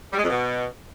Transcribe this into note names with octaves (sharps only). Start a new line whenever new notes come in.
G3
G#3
F2
B2